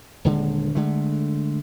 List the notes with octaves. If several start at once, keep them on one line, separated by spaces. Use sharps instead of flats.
D#1 D3 G#3
D3 G#3 A3